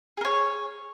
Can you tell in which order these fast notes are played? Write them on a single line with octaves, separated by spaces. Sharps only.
G#4 A#4 C#5